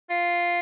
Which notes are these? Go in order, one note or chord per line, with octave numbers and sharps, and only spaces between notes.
F4